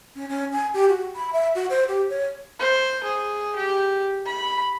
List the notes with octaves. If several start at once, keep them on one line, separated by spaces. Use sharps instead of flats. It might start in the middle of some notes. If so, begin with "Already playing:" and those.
C#4
C#4
G#5
G4
F#4
B5
E5
F#4
C5
G4
C#5
C5
G#4
G4
B5